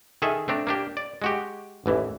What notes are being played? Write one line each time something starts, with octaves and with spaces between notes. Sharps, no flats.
D#3 G#4 A4 E5
A3 C4 D4 A#5
A#3 D4 G4
D5
G#3 F#4 G4
A1 D#2 E3